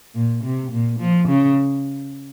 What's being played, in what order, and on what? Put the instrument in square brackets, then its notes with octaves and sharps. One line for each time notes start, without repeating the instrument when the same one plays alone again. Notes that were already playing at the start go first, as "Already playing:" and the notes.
[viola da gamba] A#2
C3
A#2
F3
C#3